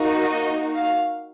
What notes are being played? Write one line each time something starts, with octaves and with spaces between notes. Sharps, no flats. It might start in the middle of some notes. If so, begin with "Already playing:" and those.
Already playing: A#3 D#4 F#4
D#5
F5